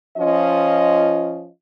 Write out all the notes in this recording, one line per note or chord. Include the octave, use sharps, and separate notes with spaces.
F3 C#4 F4 D#5